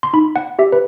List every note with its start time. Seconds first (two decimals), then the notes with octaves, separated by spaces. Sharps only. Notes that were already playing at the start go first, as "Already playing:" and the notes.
0.03 C6
0.13 D#4 B5
0.36 F#5
0.59 G4 E5
0.72 B4